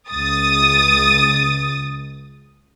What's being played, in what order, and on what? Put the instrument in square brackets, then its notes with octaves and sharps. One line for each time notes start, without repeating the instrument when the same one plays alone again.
[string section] C#2 D#6 A6